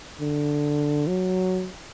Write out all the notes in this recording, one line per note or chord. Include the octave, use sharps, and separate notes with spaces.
D3
F#3